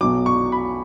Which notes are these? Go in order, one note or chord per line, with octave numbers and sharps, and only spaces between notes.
B1 B2 F#3 D6
C#6
B5